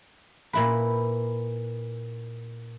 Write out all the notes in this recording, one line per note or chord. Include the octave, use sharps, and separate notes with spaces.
A#2 E4 B4